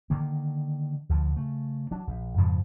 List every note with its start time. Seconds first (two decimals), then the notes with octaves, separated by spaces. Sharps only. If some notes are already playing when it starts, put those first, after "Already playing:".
0.10 D3 D#3 A#3
1.09 D2 D3 F3
1.37 C#3 A3
1.91 F#3 D4
2.07 A#1
2.37 F2 G#2 C#3 F3